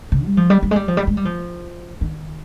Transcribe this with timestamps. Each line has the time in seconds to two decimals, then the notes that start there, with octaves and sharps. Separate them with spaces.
0.12 C#3
0.25 G3
0.37 F3
0.50 G3
0.63 G3
0.71 G#3
0.76 G3
0.88 F3
0.97 G3
1.07 G#3
1.17 G3
1.25 F3
2.01 D#3